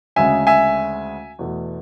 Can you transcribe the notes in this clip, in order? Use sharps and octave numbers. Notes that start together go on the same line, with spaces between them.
D2 C#3 G#3 E5 G#5
E5 G#5
E2 B2 A3